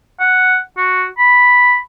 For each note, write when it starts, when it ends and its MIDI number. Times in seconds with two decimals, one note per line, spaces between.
0.20 0.57 78
0.77 1.05 66
1.18 1.76 83